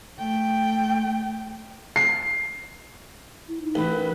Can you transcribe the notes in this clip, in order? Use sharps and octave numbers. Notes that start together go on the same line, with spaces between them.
A3 G5
C7
E4
D#4
A1 B4
A#4